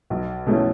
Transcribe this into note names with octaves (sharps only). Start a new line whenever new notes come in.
B1
B2 A3 C#4 E4